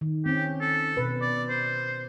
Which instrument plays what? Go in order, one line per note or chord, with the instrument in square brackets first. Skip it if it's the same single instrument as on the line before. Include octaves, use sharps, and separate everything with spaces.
[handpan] D#3
[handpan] C4 C#4 [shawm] G4
[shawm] A4
[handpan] B2 B4
[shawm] D5
C5